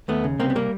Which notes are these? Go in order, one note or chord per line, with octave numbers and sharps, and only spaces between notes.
D#2 A3 B3
C#3
C2 A#3 C4
B3
G3 A#3